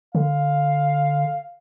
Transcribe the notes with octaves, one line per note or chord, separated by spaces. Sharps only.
D3 F5